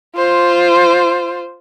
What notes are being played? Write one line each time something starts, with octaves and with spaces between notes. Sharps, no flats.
F4 C5